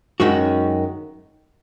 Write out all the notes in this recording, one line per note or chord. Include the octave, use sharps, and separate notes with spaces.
F#2 D#3 G#3 C#4 F#4